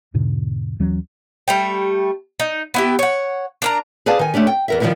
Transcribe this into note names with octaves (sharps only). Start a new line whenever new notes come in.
E2 G#2 B2 D3
D#2 E3 F#3 C#4
G3 A3 G5
D#4
B3 E4 G4
C#5 F#5
D4 A#4 A#5
G#4 B4 D5 F5 A5
D#3 G#5
A3 C#4 D4 G4
G5
E2 A#4 E5
D#3 F3 G3 G#3 E4 A#4